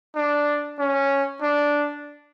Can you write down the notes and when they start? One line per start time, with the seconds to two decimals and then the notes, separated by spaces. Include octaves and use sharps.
0.16 D4
0.80 C#4
1.42 D4